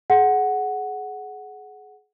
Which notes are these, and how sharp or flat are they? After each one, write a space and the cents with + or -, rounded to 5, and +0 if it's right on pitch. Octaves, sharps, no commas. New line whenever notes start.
G#4 +25 F#5 +0